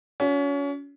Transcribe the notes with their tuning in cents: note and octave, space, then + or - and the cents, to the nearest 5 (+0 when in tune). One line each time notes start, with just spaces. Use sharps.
C#4 +30 F#4 -35